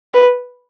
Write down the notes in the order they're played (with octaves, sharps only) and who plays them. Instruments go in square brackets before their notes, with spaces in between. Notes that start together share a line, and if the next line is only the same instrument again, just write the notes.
[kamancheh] B4